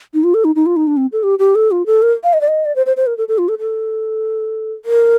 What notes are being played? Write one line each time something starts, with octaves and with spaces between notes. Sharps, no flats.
D#4
F4
A4
D#4
D#4
F4
D#4
D4
C4
A4
G4
G4
A4
F4
A4
A#4
F5
D#5
D5
D#5
D5
C5
C5
C5
A#4
A4
A4
F4
A4
A4
A#4